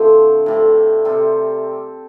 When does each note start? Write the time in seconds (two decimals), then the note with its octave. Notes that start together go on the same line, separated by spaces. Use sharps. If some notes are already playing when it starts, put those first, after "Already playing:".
Already playing: A2 D3 F3 A3 C4
0.46 A2 G3 C4
1.05 C3 G3 C4 A4